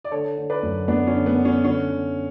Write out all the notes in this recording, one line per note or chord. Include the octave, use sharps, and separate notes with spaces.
D5
D3 A4 C#5
D3
B4 D5
F#2
F#2 B3 D4
C#4
D3
B3
D3
C#4
D3 C#4
D3